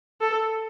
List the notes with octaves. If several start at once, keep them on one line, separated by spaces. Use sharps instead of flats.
A4